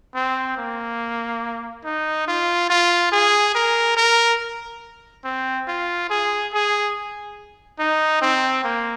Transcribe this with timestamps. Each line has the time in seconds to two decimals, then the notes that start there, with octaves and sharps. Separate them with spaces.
0.15 C4
0.57 A#3
1.85 D#4
2.28 F4
2.70 F4
3.12 G#4
3.55 A#4
3.97 A#4
5.24 C4
5.68 F4
6.10 G#4
6.53 G#4
7.79 D#4
8.22 C4
8.64 A#3